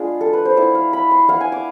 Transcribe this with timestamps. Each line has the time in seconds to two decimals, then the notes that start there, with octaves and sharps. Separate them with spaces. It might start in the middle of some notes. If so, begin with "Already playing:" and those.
Already playing: G#3 B3 D4 F4 G#4
0.21 A4
0.33 B4
0.45 C5
0.57 G#3 B3 E4 E5
0.75 F5
0.93 B5
1.11 C6
1.28 B3 E4 F5
1.40 G#5
1.52 D6